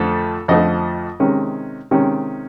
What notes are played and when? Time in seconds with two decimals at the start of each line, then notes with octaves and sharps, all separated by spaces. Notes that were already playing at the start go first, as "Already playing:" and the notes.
Already playing: F2 D3 F3 A3 A4
0.48 F2 D3 F3 A3 D#5
1.20 C3 D#3 G#3 C#4
1.91 C3 D#3 G#3 C#4